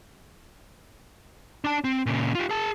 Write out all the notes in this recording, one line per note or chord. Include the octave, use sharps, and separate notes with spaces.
D4 A5
C4
A#2 C#3
F4 G4
G#4 A5